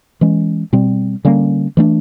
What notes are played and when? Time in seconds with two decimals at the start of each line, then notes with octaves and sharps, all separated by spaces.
0.21 E3 G#3 C#4
0.73 B2 G3 C4
1.25 D3 G3 A#3 C#4
1.77 E3 A3 D4